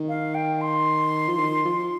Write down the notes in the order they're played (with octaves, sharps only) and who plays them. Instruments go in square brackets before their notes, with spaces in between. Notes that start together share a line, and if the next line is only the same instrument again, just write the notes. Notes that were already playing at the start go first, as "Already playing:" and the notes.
Already playing: [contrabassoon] D#3
[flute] F5
G5
C6
[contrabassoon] F3
D#3
F3